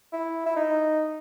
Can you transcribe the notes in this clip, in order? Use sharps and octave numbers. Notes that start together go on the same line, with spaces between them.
E4
E4
D#4